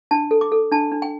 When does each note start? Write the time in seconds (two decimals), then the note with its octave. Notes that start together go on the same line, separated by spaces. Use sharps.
0.11 D4 A5
0.31 A4
0.41 D6
0.52 A4
0.72 D4 A5
0.92 D4
1.02 G5